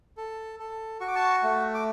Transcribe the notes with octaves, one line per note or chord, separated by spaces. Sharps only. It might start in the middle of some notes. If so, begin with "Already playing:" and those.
A4
A4
F#4 C#6
D6
A5 C#6
A3
D6